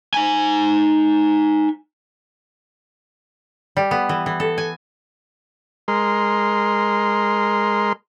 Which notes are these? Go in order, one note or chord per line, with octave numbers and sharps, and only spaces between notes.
D#4 G#5
G3
B3
E3
E3
A4
G#5
G#3 A#4 C6